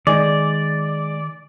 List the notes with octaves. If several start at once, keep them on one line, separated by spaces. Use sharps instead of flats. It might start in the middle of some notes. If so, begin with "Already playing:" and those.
D#3 G#3 D5